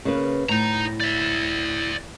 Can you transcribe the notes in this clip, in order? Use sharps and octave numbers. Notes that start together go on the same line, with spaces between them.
C#3 A#3 B4
A2 D#4 A#5
D5 E5